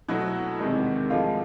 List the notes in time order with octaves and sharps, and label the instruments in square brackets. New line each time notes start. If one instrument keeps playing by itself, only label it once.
[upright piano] B2 F#3 A3 E4
E2 C3 D#3 G#3
A2 F3 G#3 F4